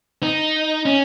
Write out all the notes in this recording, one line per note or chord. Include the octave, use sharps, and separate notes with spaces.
D#4
C#4